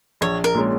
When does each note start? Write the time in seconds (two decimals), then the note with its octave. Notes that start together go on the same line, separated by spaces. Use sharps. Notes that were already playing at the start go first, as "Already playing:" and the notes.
0.21 A#1 C#5
0.44 A#4
0.55 A#2 G#3 C#4